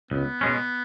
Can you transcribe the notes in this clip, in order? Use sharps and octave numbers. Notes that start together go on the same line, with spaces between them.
C#2 B3
B2 G#3 C#4